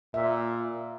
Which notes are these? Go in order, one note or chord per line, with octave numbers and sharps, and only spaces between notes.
A#2 E5